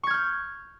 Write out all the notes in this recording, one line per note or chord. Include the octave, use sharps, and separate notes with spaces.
C#6 F6 G6 G#6